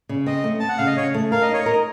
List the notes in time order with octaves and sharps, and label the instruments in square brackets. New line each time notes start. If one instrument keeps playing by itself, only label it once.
[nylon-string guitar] C#3
[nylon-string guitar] C4 [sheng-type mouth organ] D#5
[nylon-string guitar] A3
[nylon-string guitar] C4 [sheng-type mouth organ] A5
[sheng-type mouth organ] F#5
[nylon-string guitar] C#3 [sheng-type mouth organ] F5
[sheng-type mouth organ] D#5
[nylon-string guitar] C#3 [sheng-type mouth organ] C#5
[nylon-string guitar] A3
[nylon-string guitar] A#4 [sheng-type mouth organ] F5
[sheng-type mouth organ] D#5
[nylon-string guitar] D#4 [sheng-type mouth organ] C#5
[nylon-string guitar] A#4 [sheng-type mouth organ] D#5